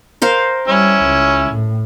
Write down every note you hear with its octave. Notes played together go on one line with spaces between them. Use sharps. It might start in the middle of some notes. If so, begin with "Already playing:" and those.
A#4 C5 F5
G3 C#4 E4
C#2
A2